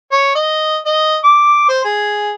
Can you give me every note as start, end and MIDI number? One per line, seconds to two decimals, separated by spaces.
0.11 0.31 73
0.35 0.78 75
0.85 1.17 75
1.24 1.67 86
1.69 1.81 72
1.84 2.33 68